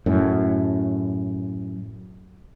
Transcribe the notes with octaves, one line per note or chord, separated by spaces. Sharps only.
F#2 A2